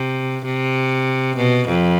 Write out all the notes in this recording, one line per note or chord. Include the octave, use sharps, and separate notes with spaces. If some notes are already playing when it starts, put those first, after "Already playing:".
Already playing: C3
C3
B2
F2